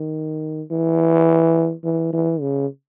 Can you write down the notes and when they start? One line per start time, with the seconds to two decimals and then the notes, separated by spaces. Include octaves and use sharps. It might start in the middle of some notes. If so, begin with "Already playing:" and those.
Already playing: D#3
0.71 E3
1.84 E3
2.12 E3
2.41 C#3